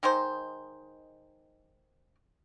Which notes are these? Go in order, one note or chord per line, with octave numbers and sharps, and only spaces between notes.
D#3 G#3 D#4 C5